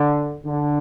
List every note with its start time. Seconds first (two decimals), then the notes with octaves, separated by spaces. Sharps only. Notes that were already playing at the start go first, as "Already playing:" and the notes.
Already playing: D3
0.46 D3